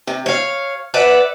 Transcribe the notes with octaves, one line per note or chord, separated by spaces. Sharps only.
C3
C#5 F5
B4 D5 E5 F#5